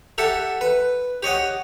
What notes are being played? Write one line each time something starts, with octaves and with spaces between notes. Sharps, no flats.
G4 A4 E5 F#5
B4
G4 C#5 D#5 F#5